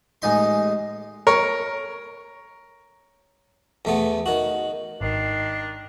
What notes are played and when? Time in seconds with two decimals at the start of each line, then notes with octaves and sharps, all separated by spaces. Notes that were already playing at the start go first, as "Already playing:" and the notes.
0.22 A1 G#3 D#4 C6
1.27 A#4 C#5
3.85 E2 A3 B3
4.26 D#3 F#4
5.01 G#1 D#3 D4 C7